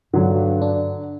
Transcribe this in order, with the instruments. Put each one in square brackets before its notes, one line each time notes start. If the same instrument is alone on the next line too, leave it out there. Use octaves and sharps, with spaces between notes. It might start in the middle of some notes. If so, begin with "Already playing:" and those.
[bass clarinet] G2 [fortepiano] D3 F#3
[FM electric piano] D4